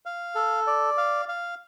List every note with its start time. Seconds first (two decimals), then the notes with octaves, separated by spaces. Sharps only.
0.05 F5
0.35 A4
0.67 D5
0.98 F5
1.29 F5